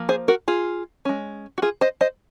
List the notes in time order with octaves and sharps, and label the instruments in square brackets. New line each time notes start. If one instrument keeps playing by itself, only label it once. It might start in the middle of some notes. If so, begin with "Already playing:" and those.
Already playing: [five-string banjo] F3 A#3
G#4 C5
F#4 A#4
F4 G#4
G#3 C#4
F#4
F4 G#4
C5 D#5
C5 D#5